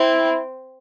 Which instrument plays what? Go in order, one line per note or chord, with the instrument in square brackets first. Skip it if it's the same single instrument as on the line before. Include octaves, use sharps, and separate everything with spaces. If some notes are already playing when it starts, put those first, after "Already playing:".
Already playing: [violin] C4 [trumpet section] E4